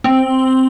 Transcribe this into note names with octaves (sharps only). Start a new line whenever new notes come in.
C4